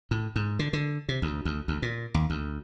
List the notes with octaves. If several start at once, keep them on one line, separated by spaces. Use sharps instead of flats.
A2
G#2
D3
D3
C3
D2
D2
D2
A#2
D#2
D2